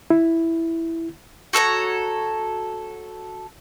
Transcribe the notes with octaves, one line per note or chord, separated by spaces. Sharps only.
E4
F#4 A4 C#5 A#5